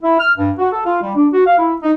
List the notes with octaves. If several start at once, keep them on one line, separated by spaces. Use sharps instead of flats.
E4
F6
G2
F#4
A4
F4
G3
D4
F#4
F5
E4
D#4